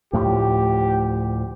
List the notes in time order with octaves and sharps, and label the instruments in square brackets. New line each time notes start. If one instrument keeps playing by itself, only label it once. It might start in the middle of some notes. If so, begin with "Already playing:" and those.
[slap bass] D2 A2 F3 [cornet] G4